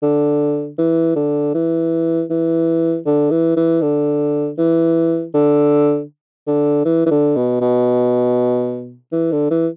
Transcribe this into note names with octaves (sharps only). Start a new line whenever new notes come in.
D3
E3
D3
E3
E3
D3
E3
E3
D3
E3
D3
D3
E3
E3
D3
B2
B2
E3
D3
E3